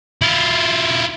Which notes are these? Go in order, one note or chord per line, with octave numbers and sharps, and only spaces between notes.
E4 F4